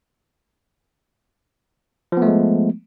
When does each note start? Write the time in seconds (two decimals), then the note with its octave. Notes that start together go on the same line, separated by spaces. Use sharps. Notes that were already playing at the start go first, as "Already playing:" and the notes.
2.12 F3
2.17 B3
2.22 A3
2.27 G#3